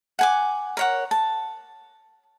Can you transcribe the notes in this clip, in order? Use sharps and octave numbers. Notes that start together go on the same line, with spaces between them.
F#5 G#5 D6
A#4 C#5 F#5
A5